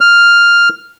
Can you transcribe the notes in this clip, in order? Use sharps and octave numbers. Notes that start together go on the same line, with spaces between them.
F6